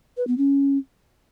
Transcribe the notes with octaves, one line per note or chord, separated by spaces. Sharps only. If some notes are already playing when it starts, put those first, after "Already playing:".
B4
B3
C#4